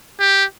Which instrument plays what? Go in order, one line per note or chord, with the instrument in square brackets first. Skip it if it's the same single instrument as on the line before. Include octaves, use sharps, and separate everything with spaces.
[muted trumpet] G4